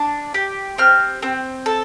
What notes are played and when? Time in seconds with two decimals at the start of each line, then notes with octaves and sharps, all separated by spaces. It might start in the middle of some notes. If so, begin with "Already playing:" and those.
Already playing: D4
0.34 G4
0.78 C4 F6
1.22 C4
1.66 A4